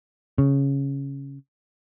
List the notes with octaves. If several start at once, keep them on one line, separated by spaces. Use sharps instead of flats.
C#3